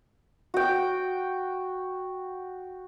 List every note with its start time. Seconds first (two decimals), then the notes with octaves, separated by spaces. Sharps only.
0.54 F#4 G5